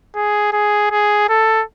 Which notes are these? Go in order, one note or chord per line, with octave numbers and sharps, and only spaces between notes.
G#4
G#4
G#4
A4